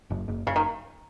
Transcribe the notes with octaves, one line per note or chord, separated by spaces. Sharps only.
F#1
F#1
F#1 C#3
D#3